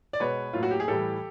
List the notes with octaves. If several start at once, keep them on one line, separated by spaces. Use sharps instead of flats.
D5
B2 G#3 B3 B4 C#5
A2 F#3 A#3 F4
F#4
G4
G#4
A2 E3 G3 G4 A4